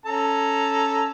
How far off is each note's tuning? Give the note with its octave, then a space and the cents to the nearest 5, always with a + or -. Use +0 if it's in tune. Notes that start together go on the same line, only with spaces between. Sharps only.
C#4 +0 A4 +0 A#5 +0